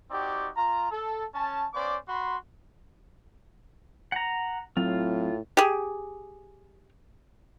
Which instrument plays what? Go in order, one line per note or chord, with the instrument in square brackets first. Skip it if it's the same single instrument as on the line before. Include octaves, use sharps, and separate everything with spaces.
[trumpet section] C4 D#4 F#4 G4 D5
F4 A#5
A4
C#4 A5
B3 C#4 C5 D5 D6
F#4 B5 C6
[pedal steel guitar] F#5 A#5
[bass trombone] A2 [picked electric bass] F#3 C4 [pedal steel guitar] F4
[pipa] G4 G#4